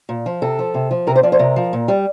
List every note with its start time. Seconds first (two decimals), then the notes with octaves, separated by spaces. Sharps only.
0.09 A#2
0.26 F3
0.42 C3 A4
0.59 F3
0.74 C3
0.91 F3
1.07 C3 A#4
1.16 C5
1.23 F3 D5
1.32 C5
1.39 C3 A#4
1.56 F3
1.73 A#2
1.88 G3